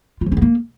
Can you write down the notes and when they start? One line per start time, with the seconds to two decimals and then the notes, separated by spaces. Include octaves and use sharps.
0.21 F4
0.26 F3
0.32 C#4
0.37 B3
0.42 A#3